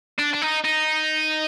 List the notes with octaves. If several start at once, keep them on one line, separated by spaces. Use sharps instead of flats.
D4
D4
D#4
D#4